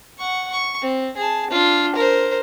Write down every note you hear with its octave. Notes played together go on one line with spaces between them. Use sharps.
F#5 C#6
C#6
C4
G#4 A5
D4 F4
A#4 C5